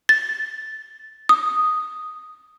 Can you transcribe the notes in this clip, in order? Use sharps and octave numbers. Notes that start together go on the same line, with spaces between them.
A6
D#6